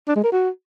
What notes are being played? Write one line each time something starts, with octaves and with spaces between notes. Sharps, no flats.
D4
G#3
A#4
F#4